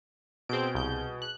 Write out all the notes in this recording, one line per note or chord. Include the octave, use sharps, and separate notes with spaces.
B2 C4 G#4 G6 D7
C2 G6
F#6